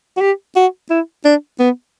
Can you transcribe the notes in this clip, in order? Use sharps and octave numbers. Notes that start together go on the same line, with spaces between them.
F#4
G4
F#4
E4
D4
B3